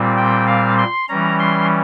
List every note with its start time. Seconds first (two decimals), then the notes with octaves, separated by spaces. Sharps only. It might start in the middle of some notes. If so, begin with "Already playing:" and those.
Already playing: A#2 G3 C4
0.17 G5
0.47 F5
0.78 C6
1.08 E3 G3 C#4 A#5
1.39 C6